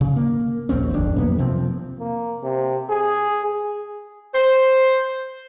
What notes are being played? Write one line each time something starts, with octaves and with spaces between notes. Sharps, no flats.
C#3
A#3
A#1 D#2 C4 C#4
D#1 G#1 F2 D4
B1 F2 A#3 B3
C3 F3 C4
A#3
C3
G#4
C5